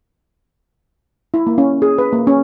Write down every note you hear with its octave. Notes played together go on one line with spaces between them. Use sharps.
E4
A#3
C#4
G#4
B4
A#3
C#4